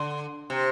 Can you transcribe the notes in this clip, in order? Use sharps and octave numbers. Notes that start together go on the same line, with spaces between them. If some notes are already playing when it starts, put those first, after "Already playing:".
Already playing: D3
C3